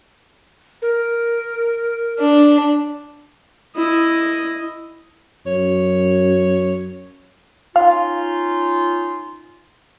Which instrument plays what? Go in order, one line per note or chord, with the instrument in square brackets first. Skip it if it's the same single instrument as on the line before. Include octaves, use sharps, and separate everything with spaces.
[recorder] A#4
[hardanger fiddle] D4
[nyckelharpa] E4 D#5
[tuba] F#2 [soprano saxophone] C#5
[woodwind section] C#4 D#4 F4 [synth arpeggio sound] F5